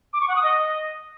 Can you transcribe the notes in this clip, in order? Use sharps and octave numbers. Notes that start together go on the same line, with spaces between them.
D6
C#6
F#5
D#6
D#5